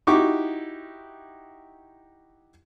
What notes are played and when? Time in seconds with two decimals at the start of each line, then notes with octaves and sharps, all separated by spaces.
0.07 D#4 E4 F#4 G4 C#6 D6